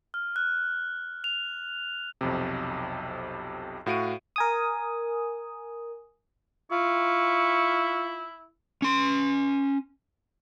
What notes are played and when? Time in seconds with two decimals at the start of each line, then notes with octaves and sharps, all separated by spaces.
0.14 F6
0.36 F#6
1.24 F7
2.21 B1 F2 C3
3.86 A2 F#4 F5 D7 D#7
4.36 A#4 G#5 D#6
6.72 E4 F4 C#6
8.82 C#4 C6